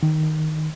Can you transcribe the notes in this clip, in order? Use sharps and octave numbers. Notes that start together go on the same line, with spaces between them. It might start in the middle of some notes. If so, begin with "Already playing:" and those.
D#3